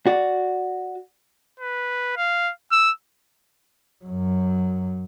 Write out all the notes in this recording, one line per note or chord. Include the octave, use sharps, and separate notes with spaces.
F#4 D5
B4
F5
E6
F#2 F#3